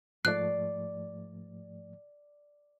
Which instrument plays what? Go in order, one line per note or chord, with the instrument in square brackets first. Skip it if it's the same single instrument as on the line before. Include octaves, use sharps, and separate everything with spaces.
[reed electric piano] G#2 F3 A3 [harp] D5 C7 [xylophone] F#6